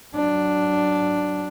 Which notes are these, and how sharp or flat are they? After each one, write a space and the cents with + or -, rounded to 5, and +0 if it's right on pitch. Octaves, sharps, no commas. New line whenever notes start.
F#3 +15 D4 +0